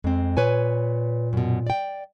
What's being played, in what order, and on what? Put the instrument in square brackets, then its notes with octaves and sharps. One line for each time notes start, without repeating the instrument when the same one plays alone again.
[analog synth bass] F2 [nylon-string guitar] G#3 C4
[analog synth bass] A#2 [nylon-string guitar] B4 C#5 G#5
[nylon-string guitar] F#2 B2
D5 G5